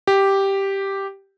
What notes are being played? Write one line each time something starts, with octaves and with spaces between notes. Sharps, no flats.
G4